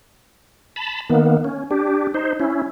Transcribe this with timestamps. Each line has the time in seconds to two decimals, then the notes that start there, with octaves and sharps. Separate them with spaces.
0.76 A5 B5
1.10 D#3 A#3 B3
1.44 C#4
1.71 D4 G4
2.14 D#4 C5
2.40 C#4 E4